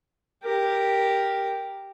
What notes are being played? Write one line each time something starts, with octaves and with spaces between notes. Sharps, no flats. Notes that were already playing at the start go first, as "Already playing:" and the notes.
G4 A#4